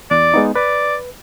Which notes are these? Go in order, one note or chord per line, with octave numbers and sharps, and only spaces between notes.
E2 D5
G#3 B3 D#4
B4 D5